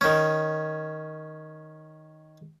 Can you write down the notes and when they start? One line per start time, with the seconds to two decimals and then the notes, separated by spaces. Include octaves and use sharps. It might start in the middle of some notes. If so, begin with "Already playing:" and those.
0.01 D#3 C#4